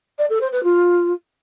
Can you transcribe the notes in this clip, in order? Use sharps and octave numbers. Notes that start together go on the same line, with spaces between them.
D5
A4
C5
B4
F4